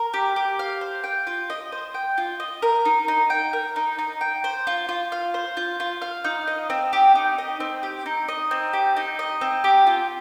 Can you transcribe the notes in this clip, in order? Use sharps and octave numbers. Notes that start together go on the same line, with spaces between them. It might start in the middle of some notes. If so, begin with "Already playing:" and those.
Already playing: A#4
G4
G4
F5
C5
G5
F4
D#5
C5
G5
F4
D#5
A#4
D#4
D#4
G5
A#4
D#4
D#4
G5
C5
F4
F4
F5
C5
F4
F4
F5
D#4
D#5
C4
G4
D#4
D#5
C4
G4
D#4
D#5
C4
G4
D#4
D#5
C4
G4
F4